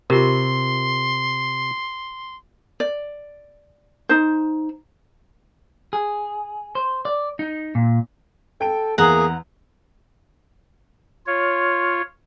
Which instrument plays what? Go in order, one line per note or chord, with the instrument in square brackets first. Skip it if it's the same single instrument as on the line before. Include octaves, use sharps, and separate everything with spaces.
[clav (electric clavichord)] C3 [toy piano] F4 G4 A#4 [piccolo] C6
[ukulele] D5
D#4 C5
[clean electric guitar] G#4
C5
D5
D#4
A#2
[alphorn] A4 [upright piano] G5 D7
[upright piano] E2 [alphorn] A#3 [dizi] G#4 [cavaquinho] F#5 A#5
[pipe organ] F4 C#5